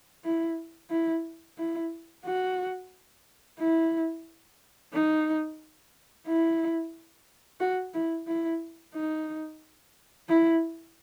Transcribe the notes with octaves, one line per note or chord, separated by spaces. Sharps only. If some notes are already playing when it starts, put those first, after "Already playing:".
E4
E4
E4
F#4
E4
D#4
E4
F#4
E4
E4
D#4
E4